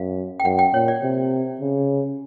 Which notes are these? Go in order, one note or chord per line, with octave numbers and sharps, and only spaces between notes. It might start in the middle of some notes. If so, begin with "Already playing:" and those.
Already playing: F#2 F5
G5
F#2 F#5
G5
A#2 C#5
D5
C3
C#3